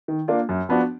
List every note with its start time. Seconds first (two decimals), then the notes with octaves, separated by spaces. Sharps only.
0.08 D#3
0.28 A#3 D4 F4
0.49 F#2
0.69 F3 B3 D4 F#4